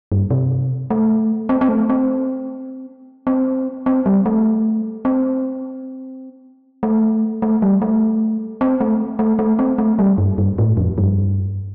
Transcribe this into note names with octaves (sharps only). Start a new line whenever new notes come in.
G2
C3
A3
C4
C4
A3
C4
C4
C4
G3
A3
C4
A3
A3
G3
A3
C4
A3
A3
A3
C4
A3
G3
G2
G2
A2
F2
G2